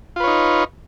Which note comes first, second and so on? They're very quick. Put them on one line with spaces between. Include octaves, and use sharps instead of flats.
F4 B4 C#5 D#4